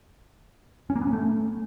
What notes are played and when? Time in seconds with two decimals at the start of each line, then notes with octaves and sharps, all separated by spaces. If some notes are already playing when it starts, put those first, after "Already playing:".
0.90 C#4
0.96 A#3
1.01 B3
1.07 C#4
1.13 A3